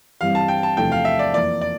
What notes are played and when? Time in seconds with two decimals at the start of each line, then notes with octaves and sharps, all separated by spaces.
0.21 G2 E3 G3 C4 F5
0.35 A5
0.48 G5
0.63 A5
0.77 E2 C3 F3 A3 D4 G5
0.92 F5
1.05 E5
1.19 D5
1.34 F2 E3 A#3 D5
1.61 D5